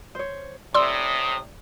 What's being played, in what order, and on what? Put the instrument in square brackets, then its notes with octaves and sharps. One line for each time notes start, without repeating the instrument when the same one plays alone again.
[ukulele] C5 C#5
[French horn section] A2 C3 [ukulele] D5 [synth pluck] C6 E6 [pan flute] D#6